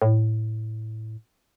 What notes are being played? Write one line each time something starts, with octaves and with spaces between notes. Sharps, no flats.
A2